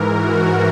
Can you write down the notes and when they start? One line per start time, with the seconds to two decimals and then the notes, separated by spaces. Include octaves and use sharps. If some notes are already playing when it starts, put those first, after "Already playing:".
Already playing: G#2 E3 A#4
0.13 F#4